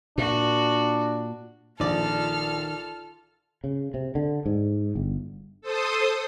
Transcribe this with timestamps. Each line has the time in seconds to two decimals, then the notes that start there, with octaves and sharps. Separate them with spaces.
0.18 A#2 D4 F#4
1.80 A#1 D#3 F4 A4 D5 F6
3.64 C#3
3.94 C3
4.15 D3
4.46 G#2
4.95 G1
5.62 A4 C5 D#6